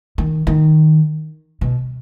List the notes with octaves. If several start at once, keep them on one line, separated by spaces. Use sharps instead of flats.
D#3
D#3
B2